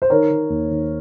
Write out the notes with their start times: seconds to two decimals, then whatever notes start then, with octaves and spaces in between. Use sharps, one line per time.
0.02 C5
0.10 D#3 A#4 C#5
0.30 D#3
0.50 D#2
0.70 D#3